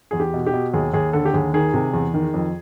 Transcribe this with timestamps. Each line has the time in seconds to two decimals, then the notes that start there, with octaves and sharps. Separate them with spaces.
0.11 E2 G#4
0.20 G4
0.34 B2
0.47 G4
0.54 B2
0.74 D#2 G#4
0.93 D#2 G#4
1.13 D3 A4
1.25 G4
1.34 D#2 G#4
1.54 D#3 G#4
1.74 C3
1.94 E2
2.14 D#3
2.34 F2